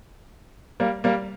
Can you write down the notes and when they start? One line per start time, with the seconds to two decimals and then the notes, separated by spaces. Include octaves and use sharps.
0.80 G3 A#3
1.04 G3 A#3